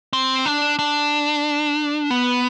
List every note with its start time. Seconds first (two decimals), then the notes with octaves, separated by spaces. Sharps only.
0.13 C4
0.46 D4
0.79 D4
2.11 B3